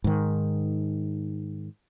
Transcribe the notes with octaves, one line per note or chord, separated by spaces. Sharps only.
G#2 D#3